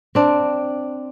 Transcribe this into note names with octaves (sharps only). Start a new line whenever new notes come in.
C4 D4